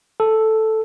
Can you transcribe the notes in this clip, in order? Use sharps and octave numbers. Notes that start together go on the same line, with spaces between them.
A4